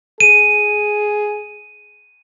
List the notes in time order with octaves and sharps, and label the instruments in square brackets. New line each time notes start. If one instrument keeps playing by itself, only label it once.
[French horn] G#4 [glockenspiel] D#7